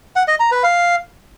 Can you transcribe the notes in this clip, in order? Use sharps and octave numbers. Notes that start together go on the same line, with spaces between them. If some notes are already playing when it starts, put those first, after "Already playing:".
F#5
D#5
A#5
B4
F5